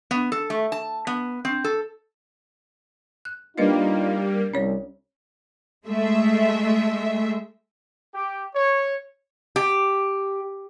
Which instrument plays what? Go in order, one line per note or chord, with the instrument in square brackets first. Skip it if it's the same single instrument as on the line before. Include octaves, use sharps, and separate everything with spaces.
[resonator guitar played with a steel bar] B3
A4
A3
A5
B3
C4
A4
[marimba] F#6
[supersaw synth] G3 A#3 [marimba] D4 B4 D#5 [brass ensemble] D#4 F4
[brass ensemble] C2 [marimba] C#4 C#5 A#6
[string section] G#3 A3 E5
[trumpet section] G4
C#5
[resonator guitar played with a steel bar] G4